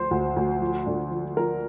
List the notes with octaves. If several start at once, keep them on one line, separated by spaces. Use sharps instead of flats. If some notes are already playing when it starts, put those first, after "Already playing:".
Already playing: D2 F3 C5
D2
D2
F3
D3
F3
F3 A#4